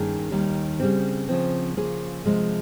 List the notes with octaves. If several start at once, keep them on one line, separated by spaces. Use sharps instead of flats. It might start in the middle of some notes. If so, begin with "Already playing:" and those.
Already playing: G2 D#3 A#3 C#4 G#4
D#2 D#3 G3
C#3 G3 C4
C#3 F3 C4
C#3 F3 A#3 F4 G#4
C3 F3 G#3